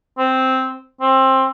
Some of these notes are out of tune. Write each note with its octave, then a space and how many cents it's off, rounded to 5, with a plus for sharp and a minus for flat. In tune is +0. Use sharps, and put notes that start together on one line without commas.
C4 -5
C4 +20